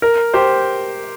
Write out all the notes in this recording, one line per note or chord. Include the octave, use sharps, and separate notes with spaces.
A#4
G4 C5